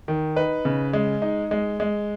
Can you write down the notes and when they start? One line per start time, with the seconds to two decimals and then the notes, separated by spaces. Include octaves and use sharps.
0.08 D#3
0.36 D#4 B4
0.65 C#3
0.93 G#3
1.22 D#4
1.51 G#3
1.80 G#3